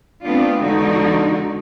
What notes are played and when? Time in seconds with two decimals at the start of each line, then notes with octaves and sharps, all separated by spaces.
0.23 A3 B3 C4 D4 F4
0.60 E2 D3 G#3 D#4 F#4